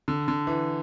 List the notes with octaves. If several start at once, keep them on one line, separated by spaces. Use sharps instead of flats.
D3
D3
E3